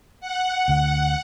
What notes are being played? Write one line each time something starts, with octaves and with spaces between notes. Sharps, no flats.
F#5
D2 D3